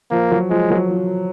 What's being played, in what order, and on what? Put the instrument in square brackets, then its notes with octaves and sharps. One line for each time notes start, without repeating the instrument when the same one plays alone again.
[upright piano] F3 [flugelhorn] A#3
[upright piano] F#3
[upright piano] F3 [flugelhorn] G#3
[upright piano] F#3
F3